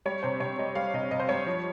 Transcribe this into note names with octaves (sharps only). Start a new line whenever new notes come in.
G3 C#5
C3 C5
C3 C#5
G3 D#5
G3 F5
C3 D#5
C3 D#5
C5
G3 C#5
F3